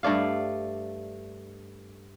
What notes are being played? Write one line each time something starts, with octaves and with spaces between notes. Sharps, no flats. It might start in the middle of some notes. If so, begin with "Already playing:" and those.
G2 A3 D5 F5